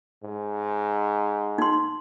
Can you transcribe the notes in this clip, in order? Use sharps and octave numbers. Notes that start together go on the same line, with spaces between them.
G#2
D#4 C6